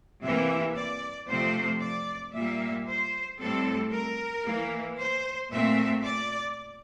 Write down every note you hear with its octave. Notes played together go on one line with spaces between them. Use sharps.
C3 E3 A#3 E5
D5
C3 F3 A3 C4 C5
D5
A#2 G3 A#3 E5
C5
A2 G3 C4 A4
A#4
E3 A#3
C5
A#2 A3 C4 E5
D5